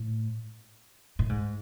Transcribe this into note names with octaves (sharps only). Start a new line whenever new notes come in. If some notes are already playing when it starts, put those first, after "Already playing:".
Already playing: A2
A2
G#2